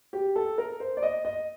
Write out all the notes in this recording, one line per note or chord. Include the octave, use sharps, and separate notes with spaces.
G4
A4
A#4
C5
D5
D#5
D#5